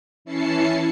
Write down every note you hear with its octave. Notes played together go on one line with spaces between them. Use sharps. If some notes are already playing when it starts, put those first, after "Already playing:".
E3 C#4 E4 A5 C7 C#7